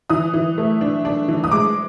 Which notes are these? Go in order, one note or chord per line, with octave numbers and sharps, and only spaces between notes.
E3 D#6
E3
A3
D4
D4
E3
D#6
G#3 D6